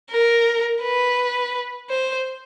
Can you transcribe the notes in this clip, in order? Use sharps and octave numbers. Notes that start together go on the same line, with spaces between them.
A#4
B4
C5